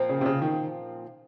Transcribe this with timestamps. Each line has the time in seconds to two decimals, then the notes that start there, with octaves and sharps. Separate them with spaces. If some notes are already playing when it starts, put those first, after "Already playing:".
Already playing: A#2 F3 C4
0.09 C#3
0.21 C3
0.26 C#3
0.42 D#3